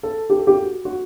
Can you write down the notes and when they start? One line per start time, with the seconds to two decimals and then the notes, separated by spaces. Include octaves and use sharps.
0.03 A4
0.30 G4
0.39 A4
0.47 G4
0.58 F#4
0.85 F#4